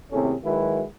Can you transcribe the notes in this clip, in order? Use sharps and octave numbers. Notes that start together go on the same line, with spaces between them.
D#2 A2 C3 C#4 G#4 A4
D#3 F#3 G#3 E4 F#4 B4